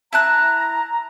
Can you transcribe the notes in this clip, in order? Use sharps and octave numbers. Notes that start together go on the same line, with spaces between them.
E4 A5 A#5 F#6